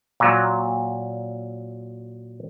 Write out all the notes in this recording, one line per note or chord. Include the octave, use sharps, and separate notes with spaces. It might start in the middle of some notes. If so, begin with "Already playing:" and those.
A#2 F#3